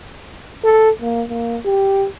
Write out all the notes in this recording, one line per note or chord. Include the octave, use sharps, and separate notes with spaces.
A4
A#3
A#3
G4